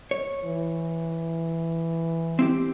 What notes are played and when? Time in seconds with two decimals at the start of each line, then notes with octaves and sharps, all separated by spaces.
0.11 C#5
0.45 E3
2.39 C4 E4 G4